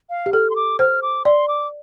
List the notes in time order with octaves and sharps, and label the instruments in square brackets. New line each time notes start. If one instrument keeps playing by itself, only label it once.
[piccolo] F5
[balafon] G4
[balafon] A4 [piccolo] F6
[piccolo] C6
D6
[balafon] C5 [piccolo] F6
[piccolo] D6
[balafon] D5 [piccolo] C6
[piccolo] D6